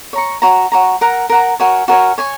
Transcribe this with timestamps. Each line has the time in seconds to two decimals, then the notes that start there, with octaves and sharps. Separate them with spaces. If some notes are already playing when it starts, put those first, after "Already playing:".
0.13 C#5 A#5 C#6
0.42 F#4 C#5 A#5
0.72 F#4 C#5 A#5
1.01 A#4 F#5 A#5
1.29 A#4 F#5 A#5
1.60 F#4 A#4 C#5 G#5
1.88 F#4 A#4 C#5 G#5
2.18 C#5 G#5 C#6